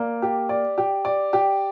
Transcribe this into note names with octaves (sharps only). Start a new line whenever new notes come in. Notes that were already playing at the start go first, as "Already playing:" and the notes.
Already playing: A#3 D5
G4
D5
G4
D5
G4